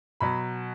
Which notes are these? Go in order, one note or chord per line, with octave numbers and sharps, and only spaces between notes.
B2 F#3 B5